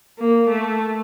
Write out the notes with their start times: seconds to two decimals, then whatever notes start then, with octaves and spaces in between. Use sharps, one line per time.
0.19 A#3
0.50 A3